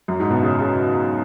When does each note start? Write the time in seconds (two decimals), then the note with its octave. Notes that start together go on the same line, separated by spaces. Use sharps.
0.08 F#2
0.20 G#2
0.30 B2
0.43 C#3
0.60 C#3